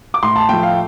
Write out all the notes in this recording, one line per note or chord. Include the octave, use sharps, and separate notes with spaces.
D6
A2 C6
A5
F3 A3 G5
F5